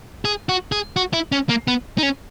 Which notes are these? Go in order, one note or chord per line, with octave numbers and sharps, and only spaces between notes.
G#4
F#4
G#4
F#4
E4
C#4
A#3
B3
D#4
C#4